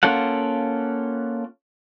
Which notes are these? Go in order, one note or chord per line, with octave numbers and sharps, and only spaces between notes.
A#3 C#4 F4 A4 F#5